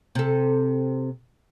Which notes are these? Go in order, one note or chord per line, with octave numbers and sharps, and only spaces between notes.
C3 A4